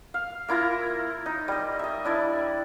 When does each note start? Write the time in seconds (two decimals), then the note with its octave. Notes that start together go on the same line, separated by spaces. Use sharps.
0.14 F5
0.49 A#3 E4 F4 A#5
1.26 D#4
1.48 G3 D#5
1.79 D#5 E5
2.05 D4 E4 D5